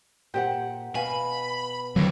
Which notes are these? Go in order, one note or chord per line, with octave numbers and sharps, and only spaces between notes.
A#2 G4 C5 D5 F#5 G5
B2 F5 G#5 B5
F2 D3 F#3